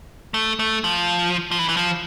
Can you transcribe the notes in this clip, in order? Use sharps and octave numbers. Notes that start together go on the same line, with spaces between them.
A3
A3
F3
F3
E3
E3
F3